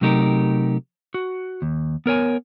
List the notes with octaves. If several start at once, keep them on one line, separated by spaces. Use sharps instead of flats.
C3 F#3 A3 D#4 G4 A#4
F#4
D#2
B3 A#4 C#5 G#5